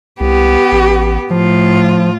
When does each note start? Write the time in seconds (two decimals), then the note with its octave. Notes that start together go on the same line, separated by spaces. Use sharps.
0.21 C2 B3 G4
0.72 A1
1.31 A2 F3 F4